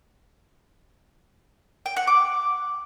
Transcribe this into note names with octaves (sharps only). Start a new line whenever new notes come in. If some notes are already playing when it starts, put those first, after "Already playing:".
G5
F#5
D6